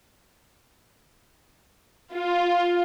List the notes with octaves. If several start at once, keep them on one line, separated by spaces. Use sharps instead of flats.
F4